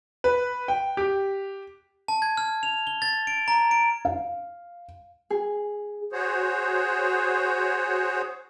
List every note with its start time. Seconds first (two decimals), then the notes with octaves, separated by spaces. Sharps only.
0.24 B4
0.68 G5
0.97 G4
2.08 A5
2.22 G#6
2.37 F6
2.63 F7
2.87 G7
3.02 A6
3.27 D7
3.48 A#5
3.71 D7
4.05 F5
5.30 G#4
6.13 F#4 G#4 C5 C#5